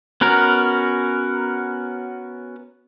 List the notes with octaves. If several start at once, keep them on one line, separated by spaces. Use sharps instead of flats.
B3 C#4 F#4 A#4